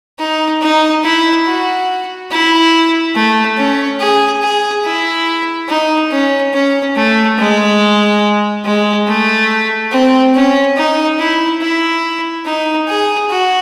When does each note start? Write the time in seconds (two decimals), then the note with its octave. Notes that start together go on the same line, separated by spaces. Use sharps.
0.19 D#4
0.62 D#4
1.04 E4
1.46 F#4
2.31 E4
3.15 A3
3.58 C#4
4.00 G#4
4.42 G#4
4.84 E4
5.69 D#4
6.11 C#4
6.54 C#4
6.96 A3
7.38 G#3
8.65 G#3
9.07 A3
9.92 C4
10.34 C#4
10.77 D#4
11.19 E4
11.61 E4
12.45 D#4
12.88 G#4
13.30 F#4